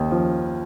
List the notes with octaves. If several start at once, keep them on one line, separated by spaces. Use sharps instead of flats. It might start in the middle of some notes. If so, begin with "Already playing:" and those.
Already playing: D#2
F3